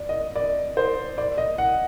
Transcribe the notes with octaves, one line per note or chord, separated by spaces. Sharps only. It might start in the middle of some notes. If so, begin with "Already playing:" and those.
Already playing: D5
D#5
D5
C5
D5
D#5
F#5